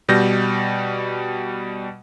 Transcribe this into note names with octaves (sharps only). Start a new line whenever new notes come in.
B2 G3 G6 A#6